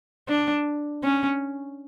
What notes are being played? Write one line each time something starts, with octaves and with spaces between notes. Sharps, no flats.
D4
C#4